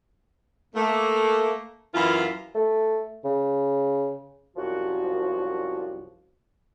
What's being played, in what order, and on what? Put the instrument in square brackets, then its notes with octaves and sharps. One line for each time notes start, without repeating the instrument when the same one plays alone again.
[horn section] A3 A#3
F#2 E3 E4 F4 F5 B5
[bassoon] A3
C#3
[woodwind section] C2 F#2 F3 F#4